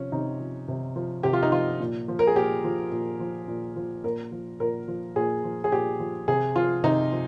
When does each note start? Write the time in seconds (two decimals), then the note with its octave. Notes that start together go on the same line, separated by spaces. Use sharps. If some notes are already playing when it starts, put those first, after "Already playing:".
Already playing: C3 F3 C#4
0.12 C3 D#4
0.40 F3
0.68 C3
0.96 F3
1.23 C3 G4
1.33 F4
1.43 D#4
1.52 F3 F4
1.80 A#2
2.08 F3
2.19 A#4
2.27 G#4
2.36 A#2 G4
2.64 F3
2.92 A#2
3.20 F3
3.48 A#2
3.76 F3
4.04 A#2 A#4
4.32 F3
4.60 A#2 A#4
4.88 F3
5.16 A#2 G#4
5.44 F3
5.64 G#4
5.72 A#2 G4
5.99 F3
6.28 C3 G#4
6.56 F3 F4
6.84 C3 D#4
7.12 F3